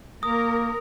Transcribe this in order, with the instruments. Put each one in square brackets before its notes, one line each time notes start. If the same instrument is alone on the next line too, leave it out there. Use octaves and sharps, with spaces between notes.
[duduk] A#3 [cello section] A#4 [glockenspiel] D#6